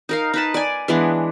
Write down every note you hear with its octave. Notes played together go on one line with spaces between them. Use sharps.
D#4 A#4 F5
D#4 B4 A5
D5 G#5
E3 G#3 B3 D4